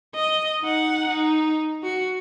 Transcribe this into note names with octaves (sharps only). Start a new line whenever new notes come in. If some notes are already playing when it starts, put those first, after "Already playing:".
D#5
D#4 F#5
D#4
F#4 C#7